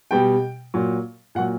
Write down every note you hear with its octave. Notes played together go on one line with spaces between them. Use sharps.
B2 G3 G5
A#2 F#3
A#2 F#3 F#5